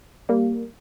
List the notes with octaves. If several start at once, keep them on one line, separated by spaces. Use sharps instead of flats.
G3 A#3